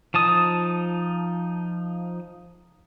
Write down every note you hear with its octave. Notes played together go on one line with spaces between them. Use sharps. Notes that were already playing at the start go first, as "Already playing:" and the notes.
F3 D#4 A5 D#6